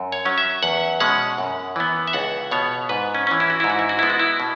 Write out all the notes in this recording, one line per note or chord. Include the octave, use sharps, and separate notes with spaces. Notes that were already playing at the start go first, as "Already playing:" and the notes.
Already playing: F#2
C#5
F#3 C#4
E5
E2 F#5
B2 G#3 C#4 F#5
F#2
E3 B3
E5
C#2 F#5
B2 B3 C#5
G#2 B4
C#4
E3 C#4
E4
F#4
G#2 E4
F#4
E4
F#4
G#3 B3 E4
F#4
E4
B2